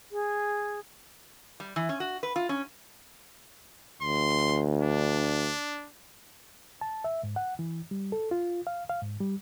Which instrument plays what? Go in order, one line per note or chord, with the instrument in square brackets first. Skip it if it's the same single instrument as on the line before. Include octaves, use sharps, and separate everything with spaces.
[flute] G#4
[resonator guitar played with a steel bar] G3
E3
C#4
F#4
B4
F4
C#4
[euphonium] D2 [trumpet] C6
[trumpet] D4
[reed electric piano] A5
E5
G#2
F#5
E3
G3
A4
F4
F5
F5
G#2
G3